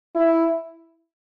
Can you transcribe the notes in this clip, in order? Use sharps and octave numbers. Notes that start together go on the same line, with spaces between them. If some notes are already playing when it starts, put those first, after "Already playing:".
E4